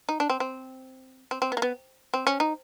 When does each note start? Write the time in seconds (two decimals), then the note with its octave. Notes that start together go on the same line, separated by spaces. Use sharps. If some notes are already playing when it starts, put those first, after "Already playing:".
0.09 D#4
0.20 D4
0.30 C4
0.40 C4
1.31 C4
1.42 C4
1.52 B3
1.57 A#3
1.62 B3
2.14 C4
2.27 C#4
2.40 D#4